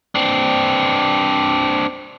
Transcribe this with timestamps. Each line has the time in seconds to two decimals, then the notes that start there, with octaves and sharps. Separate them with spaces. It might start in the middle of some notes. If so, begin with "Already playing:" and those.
0.15 C4 D4